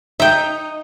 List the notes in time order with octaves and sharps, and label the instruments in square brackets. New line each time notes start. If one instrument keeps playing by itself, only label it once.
[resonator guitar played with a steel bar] D#4 [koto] E5 G5